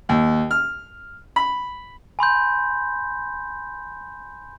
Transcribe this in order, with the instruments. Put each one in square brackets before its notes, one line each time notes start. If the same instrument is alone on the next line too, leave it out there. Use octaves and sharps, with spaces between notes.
[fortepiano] D#2
F6
B5
[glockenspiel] G#5 B5 C6 G6